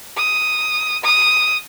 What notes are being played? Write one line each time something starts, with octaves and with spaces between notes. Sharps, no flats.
D#6
D#6